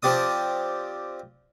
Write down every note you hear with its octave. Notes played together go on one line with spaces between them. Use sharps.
F3 C4 G4 D5 D#6